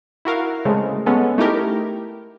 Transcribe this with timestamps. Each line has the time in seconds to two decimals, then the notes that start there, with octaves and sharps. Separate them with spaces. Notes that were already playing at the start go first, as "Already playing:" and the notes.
0.25 E4 F#4 A#4 F5
0.65 C#3 G#3 A3 C4
1.06 G#3 B3 C#4 A4
1.38 A3 D#4 E4 G4 A#4